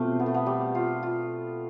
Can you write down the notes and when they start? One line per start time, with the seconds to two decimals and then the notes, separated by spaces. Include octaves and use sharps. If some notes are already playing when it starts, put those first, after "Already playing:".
Already playing: B2 A3 C4 F4 G4
0.19 B3
0.26 A3
0.34 B3
0.46 G3
0.75 F4
1.03 F4